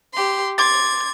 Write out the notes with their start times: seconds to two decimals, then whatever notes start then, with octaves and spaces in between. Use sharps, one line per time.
0.13 G4 C6
0.58 C6 D6 G#6 A6